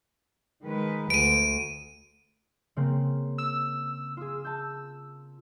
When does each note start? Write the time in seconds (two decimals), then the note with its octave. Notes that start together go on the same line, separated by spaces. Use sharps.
0.64 D#3 G#3 B4
1.10 D2 D7 D#7
2.76 C#3 A#3 C4
3.38 E6
4.17 F4 G#4
4.45 A5 G6